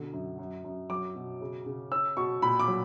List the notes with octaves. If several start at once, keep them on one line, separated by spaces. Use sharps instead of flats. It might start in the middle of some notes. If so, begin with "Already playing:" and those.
Already playing: B2 D3
F#2
F#2
F#2
F#3 D6
B2
C#3
C#3
C#4 E6
B2 C#6
A#2 B5
D6
F#3